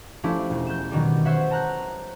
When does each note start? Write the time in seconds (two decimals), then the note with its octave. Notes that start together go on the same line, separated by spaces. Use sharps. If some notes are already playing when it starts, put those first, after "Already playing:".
0.23 F3 A3 C#4 D4 E4 G4
0.50 E1
0.67 G6 E7
0.91 B2 D#3 F#3 G3
1.25 C5 C#5 E5 F#5
1.50 A5 A#5 F#6 G6